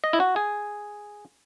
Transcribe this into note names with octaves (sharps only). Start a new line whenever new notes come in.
D#5
E4
F#4
G#4